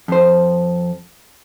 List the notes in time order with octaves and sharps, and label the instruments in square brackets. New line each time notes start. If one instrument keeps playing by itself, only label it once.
[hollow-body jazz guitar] F2 C5